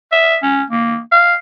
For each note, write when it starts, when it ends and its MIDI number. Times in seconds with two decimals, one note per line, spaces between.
0.12 0.37 76
0.42 0.63 61
0.70 1.00 58
1.12 1.35 77